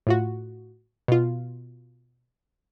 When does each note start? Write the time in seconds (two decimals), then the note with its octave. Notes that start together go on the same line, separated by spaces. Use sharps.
0.07 A2 F4 F#4
1.08 B2 F4